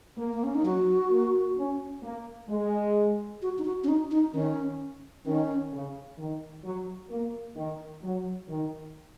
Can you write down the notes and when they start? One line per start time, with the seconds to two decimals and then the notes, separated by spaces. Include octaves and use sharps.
0.18 A#3
0.33 A#3
0.44 C#4
0.55 D#4
0.64 F#3 F#4
1.11 A#3
1.57 C#4
2.03 A#3
2.49 G#3
3.42 F#4
3.58 D#4
3.65 F#4
3.84 C#4
3.88 D#4
4.11 D#4
4.34 D#3 C#4
5.26 D#3 C#4
5.73 C#3
6.18 D#3
6.65 F#3
7.10 A#3
7.57 D#3
8.03 F#3
8.49 D#3